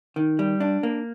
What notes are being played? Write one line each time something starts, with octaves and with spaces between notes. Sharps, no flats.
D#3
G3
D4
A#3